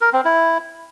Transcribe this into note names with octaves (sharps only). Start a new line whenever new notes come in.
A#4
C4
E4